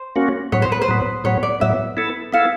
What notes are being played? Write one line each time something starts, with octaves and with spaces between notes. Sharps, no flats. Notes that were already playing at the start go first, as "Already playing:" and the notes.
Already playing: C5
A#3 C#4 F#4
A2 F#3 B3 C#5
C5
B4
C5
A2 F#3 B3
A2 F#3 B3 C#5
D5
A2 F#3 B3 E5
B3 E4 A4
B3 E4 A4 F5